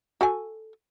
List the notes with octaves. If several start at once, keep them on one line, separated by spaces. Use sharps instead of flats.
F#4 A4 G#5